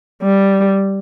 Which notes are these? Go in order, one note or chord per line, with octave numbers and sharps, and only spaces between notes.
G3